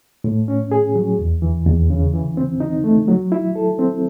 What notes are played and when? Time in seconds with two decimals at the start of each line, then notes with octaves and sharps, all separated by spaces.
0.24 A2
0.48 C#4
0.72 G#4
0.96 F#3
1.19 E2
1.42 E3
1.66 E2
1.90 C#3
2.14 E3
2.37 C4
2.60 D#4
2.84 A3
3.08 F#3
3.32 E4
3.56 A4
3.79 C4